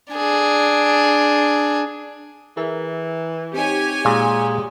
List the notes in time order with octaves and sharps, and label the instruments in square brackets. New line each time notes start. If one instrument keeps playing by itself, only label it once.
[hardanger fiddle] D4 G#4
[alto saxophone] E3 [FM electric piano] G#4 A#4 E5
[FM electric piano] C4 D#4 [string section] G4 C#5 G#5
[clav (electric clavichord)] A#2 [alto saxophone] G#3